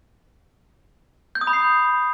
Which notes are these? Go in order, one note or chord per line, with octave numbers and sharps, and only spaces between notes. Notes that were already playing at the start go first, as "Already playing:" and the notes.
G6
D#6
B5
C7